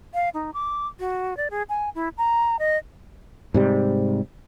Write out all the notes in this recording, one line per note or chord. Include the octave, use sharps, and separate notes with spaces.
F5
D#4
D6
F#4
D5
G#4
G#5
E4
A#5
D#5
G#2 C3 G3